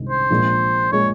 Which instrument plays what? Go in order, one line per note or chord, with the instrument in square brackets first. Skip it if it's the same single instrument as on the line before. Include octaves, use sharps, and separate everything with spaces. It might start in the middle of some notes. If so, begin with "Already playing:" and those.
Already playing: [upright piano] C2 C3 D#3 G#3 D#4
[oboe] C5
[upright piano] A#1 A#2 G#3
[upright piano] A#2 G#3 [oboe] C#5